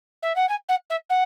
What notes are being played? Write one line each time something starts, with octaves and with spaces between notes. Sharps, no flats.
E5
F#5
G#5
F#5
E5
F#5